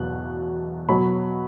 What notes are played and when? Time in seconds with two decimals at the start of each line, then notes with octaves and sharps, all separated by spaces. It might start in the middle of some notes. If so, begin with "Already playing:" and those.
Already playing: E2 B2 F#3 F#6
0.89 B2 F#3 B5